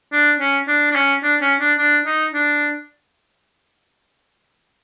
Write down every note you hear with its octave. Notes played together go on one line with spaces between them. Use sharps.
D4
C#4
D4
D4
C#4
D4
C#4
D4
D4
D#4
D4